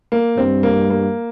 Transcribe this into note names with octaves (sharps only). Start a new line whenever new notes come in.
A#3
G2 C4
A#3
A#3